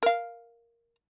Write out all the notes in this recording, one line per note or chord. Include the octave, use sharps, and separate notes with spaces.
A#4 F5